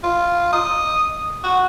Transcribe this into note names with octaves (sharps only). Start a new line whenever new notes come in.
F4
D#5
F#4